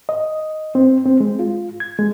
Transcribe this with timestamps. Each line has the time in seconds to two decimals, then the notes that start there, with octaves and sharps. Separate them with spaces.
0.09 D#5
0.75 C4
1.06 C4
1.20 G#3
1.39 F4
1.80 G#6
1.99 G#3